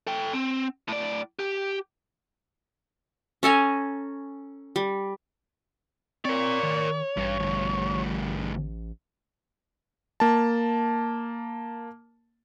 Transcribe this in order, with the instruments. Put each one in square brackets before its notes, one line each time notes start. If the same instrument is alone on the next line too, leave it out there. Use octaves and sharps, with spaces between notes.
[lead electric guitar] A4 G5
C4
A2 D5
G4
[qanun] C#4 A4 G#5 A#5
G3
[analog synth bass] C4 [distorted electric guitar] A#4 D5 [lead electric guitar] C#5
[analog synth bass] D#3
[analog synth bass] A1 [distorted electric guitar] G2
[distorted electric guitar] D2 G2
[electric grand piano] A#3 A5